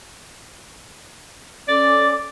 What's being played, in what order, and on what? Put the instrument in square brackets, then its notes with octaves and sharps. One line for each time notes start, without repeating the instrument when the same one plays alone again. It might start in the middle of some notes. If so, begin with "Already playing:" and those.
[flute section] C#4 A4 D6 [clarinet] D5